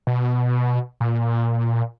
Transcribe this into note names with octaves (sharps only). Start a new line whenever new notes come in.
B2
A#2